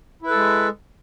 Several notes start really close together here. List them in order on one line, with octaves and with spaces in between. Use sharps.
E4 B4 A4 G#3